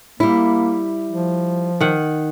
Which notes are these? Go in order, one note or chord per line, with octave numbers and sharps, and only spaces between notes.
G3 A#3 E4
F3
D#3 F#5